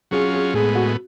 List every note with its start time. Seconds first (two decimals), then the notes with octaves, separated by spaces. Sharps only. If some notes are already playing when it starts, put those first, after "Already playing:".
0.11 F#3 C#4 F4 G#4
0.33 G#4
0.54 A2 G#3 B3 G#4
0.75 F#4